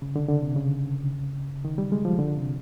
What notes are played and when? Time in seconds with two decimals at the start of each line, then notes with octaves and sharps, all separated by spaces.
0.02 C#3
0.16 D3
0.29 D3
0.43 C3
0.56 C#3
1.65 D#3
1.78 G3
1.92 G#3
2.05 F3
2.19 D3
2.37 C3